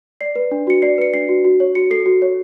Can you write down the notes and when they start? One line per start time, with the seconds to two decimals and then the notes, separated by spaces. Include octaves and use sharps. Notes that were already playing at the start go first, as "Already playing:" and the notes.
0.21 D5 C7
0.36 B4
0.51 D4
0.67 F#4 C#7
0.82 D5 C7
0.98 B4 C#7
1.14 D4 C7
1.29 F#4
1.44 F#4
1.60 C#5
1.75 F#4 C#7
1.91 A4 C7
2.06 F#4
2.22 C#5